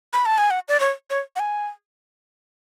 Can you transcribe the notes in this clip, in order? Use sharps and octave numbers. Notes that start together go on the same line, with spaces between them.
B5
A5
G#5
F#5
D5
C#5
C#5
F#5
G#5